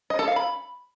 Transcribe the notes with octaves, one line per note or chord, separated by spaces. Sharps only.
D#5
A4
F5
B5